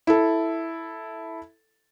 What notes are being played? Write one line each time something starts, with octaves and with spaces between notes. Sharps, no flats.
E4 A4